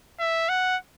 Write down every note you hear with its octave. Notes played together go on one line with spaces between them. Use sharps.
E5
F#5